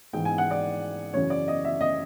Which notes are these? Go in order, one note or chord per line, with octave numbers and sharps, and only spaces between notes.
G#2 E3 G5
G#5
F#5
D5
F#2 C#3 E3 C#5
D5
D#5
E5
D#5